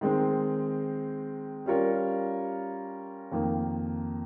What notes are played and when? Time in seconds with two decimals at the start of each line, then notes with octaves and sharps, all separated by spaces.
0.01 D#3 G#3 C4
1.66 G3 C#4 F4 A#4 C#5
3.32 F2 D#3 A#3